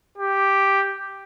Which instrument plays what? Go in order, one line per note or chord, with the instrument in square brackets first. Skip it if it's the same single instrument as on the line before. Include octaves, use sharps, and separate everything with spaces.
[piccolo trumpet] G4